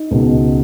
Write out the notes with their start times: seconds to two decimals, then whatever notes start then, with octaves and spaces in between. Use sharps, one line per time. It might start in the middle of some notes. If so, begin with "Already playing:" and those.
Already playing: D#4
0.11 C#2 B2